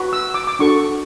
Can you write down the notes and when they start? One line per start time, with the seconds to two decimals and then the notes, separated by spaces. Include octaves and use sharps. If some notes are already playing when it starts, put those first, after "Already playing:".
Already playing: F#4 B4
0.13 E6
0.34 D6
0.47 D6
0.59 D4 F#4 A4 C#6